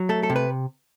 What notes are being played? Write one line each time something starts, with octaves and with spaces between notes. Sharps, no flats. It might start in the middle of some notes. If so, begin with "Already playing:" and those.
Already playing: F#3
A3 A4
A4
C3
B4